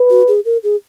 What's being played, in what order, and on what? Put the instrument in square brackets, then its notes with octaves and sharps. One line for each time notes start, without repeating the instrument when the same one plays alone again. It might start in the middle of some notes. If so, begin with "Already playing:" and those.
Already playing: [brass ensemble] B4
[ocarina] F#4
G#4
A#4
G#4